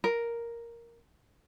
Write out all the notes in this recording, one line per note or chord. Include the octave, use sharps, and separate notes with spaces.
A#4